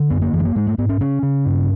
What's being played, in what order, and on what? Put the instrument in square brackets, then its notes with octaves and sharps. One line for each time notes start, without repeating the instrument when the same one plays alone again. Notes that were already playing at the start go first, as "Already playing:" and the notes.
Already playing: [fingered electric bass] D3
F#2 B3
A#3
F#2 E3
A3
A#3
G#2 G#3
A3
G#2 B3
C#4
C#3 C#4
C#3
G2